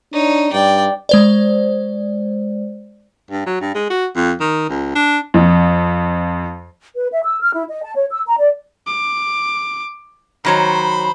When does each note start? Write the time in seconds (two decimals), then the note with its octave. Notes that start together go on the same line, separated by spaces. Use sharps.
0.13 D4 D#4 C#5
0.53 G2 D5 G5
1.09 G#3 C5 D5
3.31 G2
3.46 F#3
3.61 G2
3.75 G#3
3.90 F#4
4.16 F2
4.40 D#3
4.69 C#2
4.95 D4
5.34 F2
6.95 B4
7.12 E5
7.23 E6
7.41 F6
7.53 E4
7.69 D#5
7.83 A5
7.95 C#5
8.10 E6
8.26 A#5
8.39 D5
8.87 D6
10.45 D#3 F#3 C5 C#5 B5